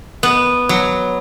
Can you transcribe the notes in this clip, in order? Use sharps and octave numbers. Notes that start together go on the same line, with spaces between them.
B3
F#3